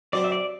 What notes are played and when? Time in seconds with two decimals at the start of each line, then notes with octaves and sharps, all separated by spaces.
0.13 F#3 C4 G4 C5 D5
0.24 E5
0.32 D5